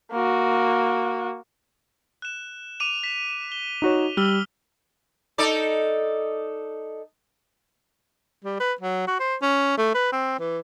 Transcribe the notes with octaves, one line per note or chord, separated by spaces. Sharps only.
A#3 F#4
F#6 E7
D6 D#7 F7
B6
G7
D#4 F#4 C#5
G3 E6 F6 G7
D#4 A4 D5
G3
B4
F#3
F#4
C5
C#4
A3
B4
C4
E3